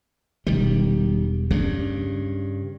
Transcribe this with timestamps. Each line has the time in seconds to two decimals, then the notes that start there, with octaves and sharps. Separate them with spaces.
0.47 E1 D#3 G3
1.51 G2 C#3 D4